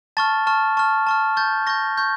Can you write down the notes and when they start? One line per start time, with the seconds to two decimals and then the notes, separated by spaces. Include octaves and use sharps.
0.17 A5 C#6 F6 A6
0.47 A5 C#6 F6
0.77 A5 C#6 F6
1.07 A5 C#6 F6
1.37 C#6 G6 A6
1.67 C#6 G6 A#6
1.97 C#6 G6